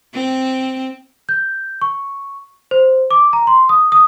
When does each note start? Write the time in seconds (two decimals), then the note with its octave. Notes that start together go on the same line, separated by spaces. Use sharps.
0.14 C4
1.29 G6
1.81 C#6
2.71 C5
3.11 D6
3.33 A#5
3.47 C6
3.69 D#6
3.92 D#6